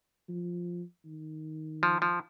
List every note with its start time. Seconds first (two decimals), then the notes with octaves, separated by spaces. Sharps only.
0.29 F3
1.05 D#3
1.83 F3
2.02 F3